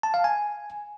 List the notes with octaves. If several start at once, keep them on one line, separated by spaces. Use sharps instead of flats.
A5
F5
G#5